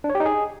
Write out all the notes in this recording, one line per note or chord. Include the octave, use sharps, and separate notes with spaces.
D4
C#5
G4
D#4
G#4